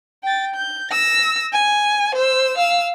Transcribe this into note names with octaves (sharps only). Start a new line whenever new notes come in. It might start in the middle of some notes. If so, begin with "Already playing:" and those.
G5 A6
G6
E6 A#6
G#5
C5 E6
F5 E6